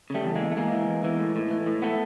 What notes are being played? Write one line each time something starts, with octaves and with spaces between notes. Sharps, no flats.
C#3 G3 A3
E2
E3 G#3 A#3
A3
E2 G#3 A#3
E3
E2
E3
A2
A2
E3
A2
E3 A3 B3